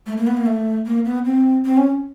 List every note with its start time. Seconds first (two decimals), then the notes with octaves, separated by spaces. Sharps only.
0.06 A3
0.17 A#3
0.27 B3
0.37 A#3
0.46 A3
0.86 A#3
1.05 B3
1.25 C4
1.65 C4
1.77 C#4